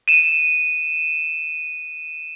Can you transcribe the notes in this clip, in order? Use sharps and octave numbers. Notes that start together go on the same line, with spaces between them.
D#7 E7